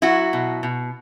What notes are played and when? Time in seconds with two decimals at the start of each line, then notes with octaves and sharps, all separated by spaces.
0.02 F#3 E4 F#4
0.33 B2
0.63 B2